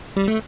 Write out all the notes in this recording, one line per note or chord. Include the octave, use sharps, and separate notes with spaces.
G3
A3